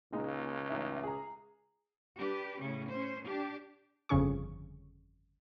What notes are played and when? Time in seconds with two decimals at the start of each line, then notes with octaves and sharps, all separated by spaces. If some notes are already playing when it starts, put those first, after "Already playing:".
0.13 C#2 A#2 G#3 D#4
0.69 A1 D#4 E5
1.03 G#4 A#5
2.17 D4 G4 B4
2.59 A2 C#3 C#4
2.89 C#4 C5
3.25 D4 G4
4.09 G1 F2 C#3 C#4 G#4 C#6